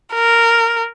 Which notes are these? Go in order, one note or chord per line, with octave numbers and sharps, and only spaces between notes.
A#4